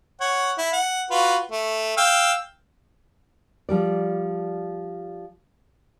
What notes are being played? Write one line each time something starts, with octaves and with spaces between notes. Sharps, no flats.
C#5 F#5
E4
F#5
F4 F#4 B4
A3
F5 G5 E6
F3 G3 D5